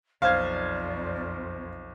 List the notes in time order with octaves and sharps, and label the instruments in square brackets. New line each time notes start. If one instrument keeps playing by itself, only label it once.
[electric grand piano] B1 C5 G#6 [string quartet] F2 [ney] D5 [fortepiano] F5